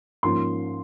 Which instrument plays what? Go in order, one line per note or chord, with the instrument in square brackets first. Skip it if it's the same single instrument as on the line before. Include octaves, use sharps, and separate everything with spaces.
[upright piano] G#2 F3 A#3 C#4 C6